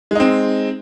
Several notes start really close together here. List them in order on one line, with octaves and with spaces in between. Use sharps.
G#3 D#4 C4